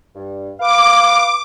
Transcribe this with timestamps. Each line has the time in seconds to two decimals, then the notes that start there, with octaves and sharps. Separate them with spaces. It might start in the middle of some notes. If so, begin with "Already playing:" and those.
0.15 G2
0.60 B4 F5 D6